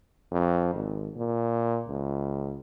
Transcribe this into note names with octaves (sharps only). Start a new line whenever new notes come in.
F2
G#1
A#2
C#2